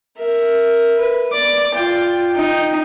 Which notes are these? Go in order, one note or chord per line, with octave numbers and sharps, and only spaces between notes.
A#4 E5
B4
D5 D6
F4 G5
D#4 G5